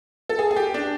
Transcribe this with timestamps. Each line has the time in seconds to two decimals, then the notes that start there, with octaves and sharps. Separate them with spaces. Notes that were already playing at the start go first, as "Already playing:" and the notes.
0.29 A4
0.39 G#4
0.51 G#4
0.56 G4
0.74 D4